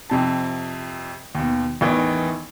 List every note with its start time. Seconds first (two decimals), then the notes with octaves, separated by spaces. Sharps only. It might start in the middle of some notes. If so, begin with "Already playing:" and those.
0.10 F2 C3 A5
1.35 D#2 B2
1.81 A1 E2 D#3 E3